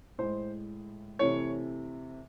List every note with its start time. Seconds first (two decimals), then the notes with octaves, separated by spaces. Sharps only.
0.18 A2 G#3 C5
1.19 C3 E3 A3 C#5